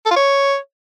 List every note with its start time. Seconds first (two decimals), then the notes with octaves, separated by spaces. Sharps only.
0.06 A4
0.11 F4
0.16 C#5